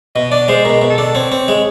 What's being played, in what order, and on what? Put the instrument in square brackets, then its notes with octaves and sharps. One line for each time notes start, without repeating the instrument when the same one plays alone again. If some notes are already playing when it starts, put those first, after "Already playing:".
[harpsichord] B2 [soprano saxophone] D#5
[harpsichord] D4 [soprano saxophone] D5
[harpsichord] G#3 [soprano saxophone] C5
[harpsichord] B2 [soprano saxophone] A#4
[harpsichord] B2
[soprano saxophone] A4
[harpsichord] D4
[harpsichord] C4 [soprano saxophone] C#5
[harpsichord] C4
G#3